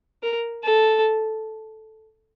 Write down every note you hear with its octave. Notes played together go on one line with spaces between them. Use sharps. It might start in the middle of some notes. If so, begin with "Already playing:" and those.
A#4
A4